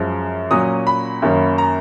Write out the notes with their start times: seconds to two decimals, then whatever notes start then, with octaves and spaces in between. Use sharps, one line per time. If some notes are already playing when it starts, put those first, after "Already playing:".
Already playing: F#2 F3 G#3
0.51 A#2 F#3 C#4 D#6
0.87 B5
1.22 F#2 D#3 A#3 C#4
1.58 A#5